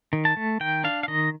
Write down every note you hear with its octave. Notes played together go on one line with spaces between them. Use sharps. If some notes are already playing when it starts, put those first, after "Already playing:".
D#3
A5
A3
D#3 G5
D4 F5
F5
D#3 D#5